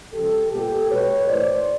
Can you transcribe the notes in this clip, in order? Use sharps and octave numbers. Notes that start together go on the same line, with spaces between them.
C#3 F3 G#3 G4 A4
A#2 G3 B3 G4 A4
B2 G#3 B3 B4 C#5
A2 E3 A3 C5 D5